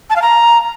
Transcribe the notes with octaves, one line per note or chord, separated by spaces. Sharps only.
A5
F5
A#5